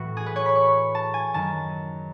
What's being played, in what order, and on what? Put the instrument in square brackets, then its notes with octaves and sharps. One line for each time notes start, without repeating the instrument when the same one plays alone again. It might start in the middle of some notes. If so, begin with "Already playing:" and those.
Already playing: [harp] A2 E3 F#4 B4
G#4
B4
C#5
B5
C#6
A5
G#5
F#2 D#3 F#3 A5